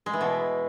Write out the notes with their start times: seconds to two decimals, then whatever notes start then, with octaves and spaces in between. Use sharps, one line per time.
0.06 G#3
0.13 E3
0.21 B2